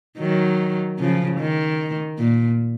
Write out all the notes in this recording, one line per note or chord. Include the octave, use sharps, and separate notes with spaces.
D#3 F#3
C#3 F3
D#3
A#2